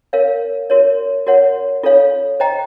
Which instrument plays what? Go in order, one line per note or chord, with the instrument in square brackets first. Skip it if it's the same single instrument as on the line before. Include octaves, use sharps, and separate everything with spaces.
[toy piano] A#4 C#5 F5
F#4 A#4 C#5
F#4 A#4 C#5 F#5
F4 A4 C#5 F5
C5 D#5 G5 A#5